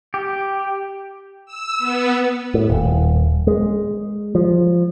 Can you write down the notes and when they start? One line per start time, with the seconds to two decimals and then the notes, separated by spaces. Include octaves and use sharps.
0.14 G4
1.46 E6
1.78 B3
2.54 A2
2.70 D#1
3.47 G#3
4.35 F3